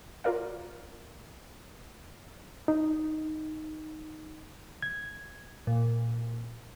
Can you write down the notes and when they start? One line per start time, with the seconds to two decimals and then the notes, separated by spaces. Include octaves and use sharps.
0.24 F4 F#4 A#4 D5 F5
2.68 D#4
4.82 G#6
5.67 A#2